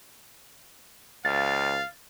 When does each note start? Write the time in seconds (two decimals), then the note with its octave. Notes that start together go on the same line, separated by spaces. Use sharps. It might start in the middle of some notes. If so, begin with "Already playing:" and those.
1.25 C#2 F5 A6